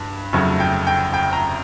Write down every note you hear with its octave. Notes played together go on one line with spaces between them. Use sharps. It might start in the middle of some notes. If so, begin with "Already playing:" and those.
Already playing: G2
F1 F2 C#3 F#3 A3
G5
G5
G5
A#5